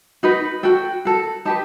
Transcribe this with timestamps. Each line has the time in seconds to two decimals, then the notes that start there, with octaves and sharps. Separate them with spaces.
0.23 D#4 F#4 B4
0.63 F#4 A4 G5
1.05 F#4 A4
1.45 D#4 G4 B4 A5